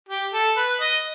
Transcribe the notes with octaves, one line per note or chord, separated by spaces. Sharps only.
G4
A4
B4
D#5